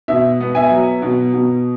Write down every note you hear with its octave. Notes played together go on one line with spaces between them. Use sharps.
B2 E5
B3
E5 G#5
F#3
B2
B2